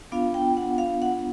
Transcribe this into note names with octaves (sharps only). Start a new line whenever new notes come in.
B3 D4 F4 F5
G5
F#5
F5
F#5